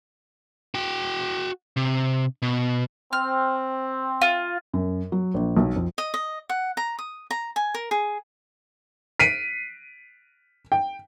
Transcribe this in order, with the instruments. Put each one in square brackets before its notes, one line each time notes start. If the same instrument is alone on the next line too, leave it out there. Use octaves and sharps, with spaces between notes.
[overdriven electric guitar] F#4 G5
C3
B2
[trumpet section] C4 [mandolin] F6
[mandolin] F4
[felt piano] F#2
F#3
A#1
B1
F2
[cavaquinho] D#5
D#5
F#5
A#5
D#6
A#5
G#5
A#4
G#4
[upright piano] B6 C7 D7 D#7
G5